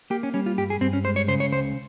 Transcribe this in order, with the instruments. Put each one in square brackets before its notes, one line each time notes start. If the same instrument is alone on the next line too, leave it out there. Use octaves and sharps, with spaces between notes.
[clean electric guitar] A#3 G4
C#4
G3 C#4
F4
G2 G4
G#4
G2 C4
C#4
G#3 C5
C#5
C#3 C5
C#5
C#2 C5